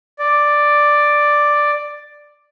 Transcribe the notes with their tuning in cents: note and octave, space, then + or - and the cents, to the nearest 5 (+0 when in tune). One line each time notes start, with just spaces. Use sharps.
D5 +5